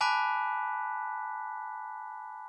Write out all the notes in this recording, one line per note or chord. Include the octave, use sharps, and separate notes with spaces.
G#5 A5 B5 D6 F#6 B6